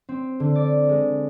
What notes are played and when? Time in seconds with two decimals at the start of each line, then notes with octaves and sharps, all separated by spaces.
0.09 C4
0.40 D3
0.55 D5
0.89 G#3